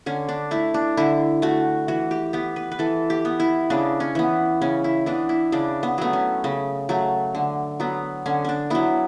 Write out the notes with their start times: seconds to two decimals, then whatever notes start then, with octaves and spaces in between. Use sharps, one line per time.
0.06 D3 C#4
0.29 D4
0.51 A3 E4
0.74 D4
0.97 D3 E4
1.42 A3 F#4
1.88 E3 F#4
2.11 G4
2.33 B3 G4
2.56 B4
2.72 B4
2.79 E3 A4
3.10 G4
3.25 B3
3.40 E4
3.70 C#3 D4
4.00 C#4
4.15 E3 B3
4.62 C#3 C#4
4.84 E4
5.06 E3 B3 D4
5.29 E4
5.52 C#3 D4
5.83 B3
5.98 F#3 A3 B3
6.13 C#4
6.44 C#3
6.89 F#3 A3
7.35 D3
7.80 F#3 B3
8.26 D3 C#4
8.45 C#4 D4
8.70 F#3 B3 E4